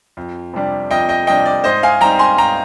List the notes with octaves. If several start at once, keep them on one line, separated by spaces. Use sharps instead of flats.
F2
C3 G3 D4
F2 D#5 G5
D#5 G5
C3 G3 D4 D#5 G5
D5
G#2 C5 D#5
F5 G#5
G3 C4 D#4 G5 A#5
G#5 C6
G#2 G5 A#5